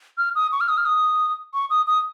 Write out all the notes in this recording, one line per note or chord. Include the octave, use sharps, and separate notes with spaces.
F6
D#6
C#6
F6
D#6
F6
D#6
C#6
D#6
D#6